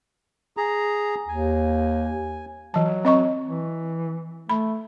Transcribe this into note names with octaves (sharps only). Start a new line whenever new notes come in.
G#4 A#5
D#2 G#5
E3 F#3 A5
C4 D#5 C#6
E3
A3 B5